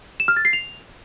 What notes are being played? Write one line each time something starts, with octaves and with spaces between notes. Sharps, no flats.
E7
F6
A6
C7
F7